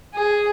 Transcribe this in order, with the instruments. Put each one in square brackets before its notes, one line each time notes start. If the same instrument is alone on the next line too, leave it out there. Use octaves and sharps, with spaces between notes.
[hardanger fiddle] G#4